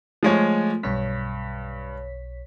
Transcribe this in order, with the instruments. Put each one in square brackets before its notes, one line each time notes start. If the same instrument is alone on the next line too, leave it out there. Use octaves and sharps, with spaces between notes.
[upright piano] F3 G#3 C#5 [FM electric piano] A3
[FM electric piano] B1 C#5 B6 [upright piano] G2